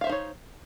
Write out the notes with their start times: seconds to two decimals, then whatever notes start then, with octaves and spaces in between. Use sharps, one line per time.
0.01 F5
0.04 E5
0.07 C5
0.09 D#4
0.12 C#5